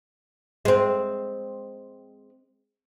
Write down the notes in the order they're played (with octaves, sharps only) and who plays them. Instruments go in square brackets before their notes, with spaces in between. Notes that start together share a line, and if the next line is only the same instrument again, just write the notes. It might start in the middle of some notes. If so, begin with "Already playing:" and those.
[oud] G#3 C4